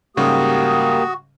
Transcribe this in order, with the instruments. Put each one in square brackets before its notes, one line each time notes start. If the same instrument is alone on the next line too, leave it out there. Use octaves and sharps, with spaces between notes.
[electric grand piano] G#2 C#3 G3 [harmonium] A#3 G4 [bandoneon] F#4 [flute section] D#6